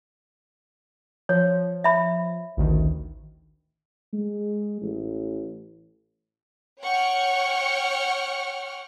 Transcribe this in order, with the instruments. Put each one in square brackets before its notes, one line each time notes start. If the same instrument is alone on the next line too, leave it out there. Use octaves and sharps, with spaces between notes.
[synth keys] F3 [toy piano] C#5
[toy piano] E5 B5
[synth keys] A1 D2 D#3
[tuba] G#3
A1
[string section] C#5 F#5 G5 C#6 F6